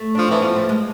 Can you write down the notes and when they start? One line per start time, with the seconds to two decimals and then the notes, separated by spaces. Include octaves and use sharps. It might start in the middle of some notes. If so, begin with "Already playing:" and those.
Already playing: A3
0.15 F3 D4
0.28 E3 C4
0.42 F3 B3
0.56 A3
0.69 G#3